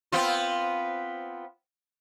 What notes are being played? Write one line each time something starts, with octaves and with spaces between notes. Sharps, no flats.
B3 C4 F4